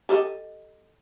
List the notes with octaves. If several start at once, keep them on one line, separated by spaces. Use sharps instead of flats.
G4 A4 D#5